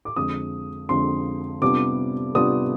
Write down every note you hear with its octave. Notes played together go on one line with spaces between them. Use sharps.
D6
F2 D3 G#3 D#6
F2 D3 G#3 C6
C3 G3 B3 D4 F4 D6
C3 G3 B3 D4 F4 D#6